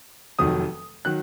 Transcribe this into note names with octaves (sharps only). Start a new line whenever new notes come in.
F1 F2 D#3 F#3 D#6
D#3 F#3 F#6